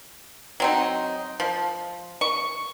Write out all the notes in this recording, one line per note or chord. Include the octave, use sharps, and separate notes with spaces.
F#3 C4 D#4
F3
C#6